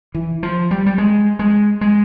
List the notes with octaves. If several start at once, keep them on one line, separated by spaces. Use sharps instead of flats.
E3
F3
G3
G3
G#3
G#3
G#3